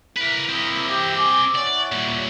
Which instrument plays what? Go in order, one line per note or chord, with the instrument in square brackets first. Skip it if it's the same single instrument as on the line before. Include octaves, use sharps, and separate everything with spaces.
[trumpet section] A#3 E4 [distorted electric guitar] A#4 B4
[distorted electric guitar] C4 D#5
[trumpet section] G4
G#5 D6
[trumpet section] E4 C#5 F#5 [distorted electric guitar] D5
[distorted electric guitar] A#2 G3